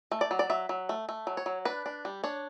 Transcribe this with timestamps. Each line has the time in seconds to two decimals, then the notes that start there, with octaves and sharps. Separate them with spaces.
0.12 A3
0.21 D5
0.31 F#3
0.39 D5
0.50 F#3 E5
0.69 F#3
0.89 A3
1.09 A3
1.27 F#3
1.37 C#5
1.46 F#3
1.65 D4 B4
1.86 D4
2.05 G3
2.24 D4 C#5